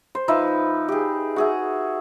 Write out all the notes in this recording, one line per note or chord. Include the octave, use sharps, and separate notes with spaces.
C5
F3 D#4 B4 E5
G4 G#4
F#4 G#4 E5